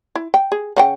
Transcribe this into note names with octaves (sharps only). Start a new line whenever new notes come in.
E4
G5
G#4
C#3 F#5 G5